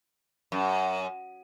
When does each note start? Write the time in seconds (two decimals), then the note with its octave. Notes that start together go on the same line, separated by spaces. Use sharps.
0.52 F#2